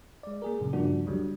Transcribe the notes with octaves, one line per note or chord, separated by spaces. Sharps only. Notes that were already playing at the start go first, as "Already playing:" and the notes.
G#3 D5
A#3 G#4 A#4
F#2 A#2 C#3
G2 C#3 F3 A#3 D4 F#4
D2 D3 F#3 G3